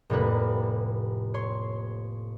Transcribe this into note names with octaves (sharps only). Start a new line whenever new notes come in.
F1 A2 G3 A#3 B4
C#5 C6